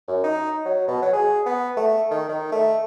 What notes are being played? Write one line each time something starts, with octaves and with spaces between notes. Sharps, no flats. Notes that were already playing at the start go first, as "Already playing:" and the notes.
F#2
D#4
F#3
B2
F#3
G#4
B3
A3
D#3
D#3
A3